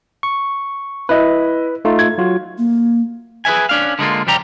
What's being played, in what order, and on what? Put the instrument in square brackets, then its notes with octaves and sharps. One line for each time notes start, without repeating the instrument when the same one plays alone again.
[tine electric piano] C#6
[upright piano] E4 D#5 [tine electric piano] B4
[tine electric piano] A3 D#4 F4
[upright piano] G#6
[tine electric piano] F#3 F4 F#4
[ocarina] A#3
[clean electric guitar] G#4 B4 C5 E5 G#5
C#4 D4 F5
D3 G#3 A#3 F4
C2 F2 G3 G4 A#5